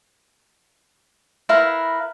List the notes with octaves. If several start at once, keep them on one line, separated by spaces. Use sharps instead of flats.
E4 A#4 B4 F5